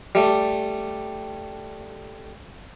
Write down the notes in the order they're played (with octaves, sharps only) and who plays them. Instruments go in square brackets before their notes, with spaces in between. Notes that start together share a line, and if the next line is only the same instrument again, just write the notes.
[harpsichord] G3 A3